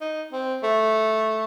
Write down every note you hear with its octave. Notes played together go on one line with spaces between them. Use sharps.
D#4
C4
A3